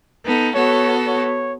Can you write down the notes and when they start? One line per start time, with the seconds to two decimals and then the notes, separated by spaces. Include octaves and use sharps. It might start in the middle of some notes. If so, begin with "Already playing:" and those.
0.24 B3 D#4 A4
0.55 B3 F#4 A4 C#5
1.07 C#5